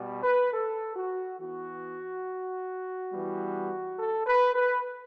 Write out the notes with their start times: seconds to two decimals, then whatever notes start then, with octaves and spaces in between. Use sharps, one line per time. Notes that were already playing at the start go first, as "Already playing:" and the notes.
Already playing: B2 G3 B3
0.23 B4
0.53 A4
0.96 F#4
1.39 E3 B3 F#4
3.12 E3 G3 B3
3.98 A4
4.26 B4
4.55 B4